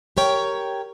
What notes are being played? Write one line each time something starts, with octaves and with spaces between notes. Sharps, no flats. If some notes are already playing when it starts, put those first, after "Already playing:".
G4 A#4 C#5 G5